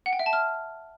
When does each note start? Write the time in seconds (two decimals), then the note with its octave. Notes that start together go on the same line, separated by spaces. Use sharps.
0.06 F#5
0.13 G5
0.19 E5
0.26 A5
0.33 F6